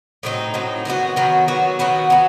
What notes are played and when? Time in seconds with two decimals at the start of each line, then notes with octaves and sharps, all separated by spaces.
0.23 A2 F#3 C4 D#4
0.54 A2 F#3 C4 D#4
0.85 D#3 F#3 B3 F#4
1.16 D#3 F#3 B3 F#4
1.48 D#3 F#3 B3 F#4
1.79 D#3 F#3 B3 F#4
2.10 F#3 B3